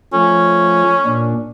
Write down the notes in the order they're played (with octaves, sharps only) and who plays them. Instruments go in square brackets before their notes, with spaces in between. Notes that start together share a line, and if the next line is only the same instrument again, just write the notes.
[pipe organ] F3 A3 [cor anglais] C#4
[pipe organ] A#2 D4